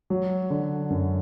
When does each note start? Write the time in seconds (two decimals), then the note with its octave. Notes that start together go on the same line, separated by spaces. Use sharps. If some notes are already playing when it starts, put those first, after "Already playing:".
0.10 F#3
0.50 D3
0.90 F#2